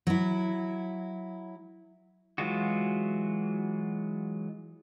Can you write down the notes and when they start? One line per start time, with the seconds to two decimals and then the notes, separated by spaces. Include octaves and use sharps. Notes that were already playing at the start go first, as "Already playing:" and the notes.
0.07 F#3 E4
2.38 E3 F#3 G#3 F4 F#4